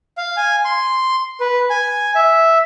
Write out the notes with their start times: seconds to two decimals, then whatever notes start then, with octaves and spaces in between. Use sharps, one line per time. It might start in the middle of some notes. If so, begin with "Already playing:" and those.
0.18 F5
0.37 G#5
0.65 C6
1.40 B4
1.70 G#5
2.15 E5